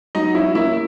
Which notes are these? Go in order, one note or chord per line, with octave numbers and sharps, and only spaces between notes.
F#3 D#4 D#5
C#4 E4 E5
A#3 E4 E5